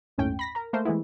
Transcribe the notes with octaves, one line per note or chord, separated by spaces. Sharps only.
G1 D#2 A2 C#4 G5
B5 A#6 B6
A#4 A#5
A3 A#3 A#4 C5
E3 G#3 A3 B3 E4